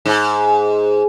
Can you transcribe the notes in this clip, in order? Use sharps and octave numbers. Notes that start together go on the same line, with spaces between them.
G#2